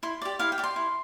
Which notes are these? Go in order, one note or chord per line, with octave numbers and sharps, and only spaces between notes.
E4 C6
G4 D5
E4 F5
G5
G4 D5
C6
E4